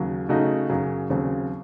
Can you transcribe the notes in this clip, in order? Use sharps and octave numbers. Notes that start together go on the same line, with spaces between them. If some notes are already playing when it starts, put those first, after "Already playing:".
Already playing: D#2 C#3 F#3
C#3 A3 D#4 F#4
F#2 C#3 F#3
D#2 C#3 F#3 C4